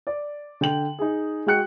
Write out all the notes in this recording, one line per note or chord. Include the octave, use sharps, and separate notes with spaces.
D5
D3 G5 F#7
D#4 G#4
G#3 F#4 G5 F#6 C#7